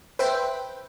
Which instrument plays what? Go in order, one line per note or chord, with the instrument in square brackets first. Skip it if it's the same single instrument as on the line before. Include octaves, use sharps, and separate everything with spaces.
[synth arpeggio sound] B4 C5 E5 G5